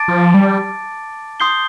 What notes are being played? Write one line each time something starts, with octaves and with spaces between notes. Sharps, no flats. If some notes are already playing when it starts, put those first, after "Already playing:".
Already playing: A5 D6 A6 D7
F3
G3
C6 D#6 G6 C7 G7